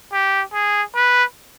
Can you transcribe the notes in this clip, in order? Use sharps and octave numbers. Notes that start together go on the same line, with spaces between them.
G4
G#4
B4